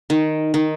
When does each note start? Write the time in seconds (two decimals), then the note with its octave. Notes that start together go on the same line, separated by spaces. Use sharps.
0.10 D#3
0.54 D#3